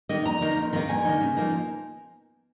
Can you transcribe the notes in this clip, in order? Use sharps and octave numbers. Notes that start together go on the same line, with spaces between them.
D#3 A#3 D#4 D#5
F2 A#5
D#3 A#3 D#4
F2
D#3 A#3 D#4
F2 G#5
D#3 A#3 D#4
C#3
F3 A#3 D#4